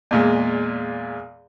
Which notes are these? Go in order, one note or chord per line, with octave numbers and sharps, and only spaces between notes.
E2 A#2 G#3